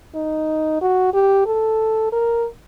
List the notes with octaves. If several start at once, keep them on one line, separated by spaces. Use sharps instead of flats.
D#4
F#4
G4
A4
A#4